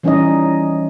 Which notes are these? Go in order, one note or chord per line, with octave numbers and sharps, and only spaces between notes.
E3 G3 C#4 D#4 C#5 D#5